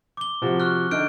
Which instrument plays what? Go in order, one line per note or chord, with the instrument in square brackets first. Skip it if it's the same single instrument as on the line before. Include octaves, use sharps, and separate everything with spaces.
[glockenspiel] D6 G7
[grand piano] C3 F3 F#4
[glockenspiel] C#6 F6 F#6
[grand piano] D3 D#4 A4 [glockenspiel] F6 G6 D7